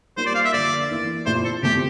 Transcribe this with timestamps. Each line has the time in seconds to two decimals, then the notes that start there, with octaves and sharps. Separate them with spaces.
0.17 G3 A#3 F4 A#4 C5
0.26 D5
0.35 F5
0.45 E5
0.53 D3 F3 A#3 D5
0.90 E3 A#3 E4
1.26 A#2 A3 C4 E4 C5
1.44 A4
1.63 C3 F3 A3 G4